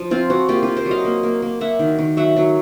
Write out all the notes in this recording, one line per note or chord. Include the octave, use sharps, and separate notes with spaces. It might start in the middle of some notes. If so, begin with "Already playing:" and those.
Already playing: F3
C4 F4
C4 F#4
A#3 F4 G4
A#3 F4 G4
A#4 C5
F#3
D#5 F5
A#3
A#3
A#3
A#3 E5 F#5
D#3
D#3
F#3 E5 F#5
F#3